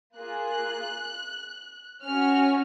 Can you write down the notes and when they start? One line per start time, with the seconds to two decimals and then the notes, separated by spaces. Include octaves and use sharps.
0.15 A#3 F4 G#4 F#6
2.04 C#4 F#4 F6